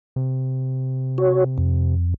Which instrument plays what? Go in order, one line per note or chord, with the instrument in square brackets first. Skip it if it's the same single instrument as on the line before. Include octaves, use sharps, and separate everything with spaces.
[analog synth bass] C3
[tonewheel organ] F#4 C#5
F2